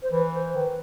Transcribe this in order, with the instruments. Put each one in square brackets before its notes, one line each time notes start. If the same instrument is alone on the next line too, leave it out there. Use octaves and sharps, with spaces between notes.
[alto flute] C5
[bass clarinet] E3 [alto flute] B4
[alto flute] C5
[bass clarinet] D#3 [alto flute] B4